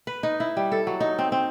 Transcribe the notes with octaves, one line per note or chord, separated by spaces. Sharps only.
B4
D#4
E4
G3
A4
F#3
D#4
C4
C4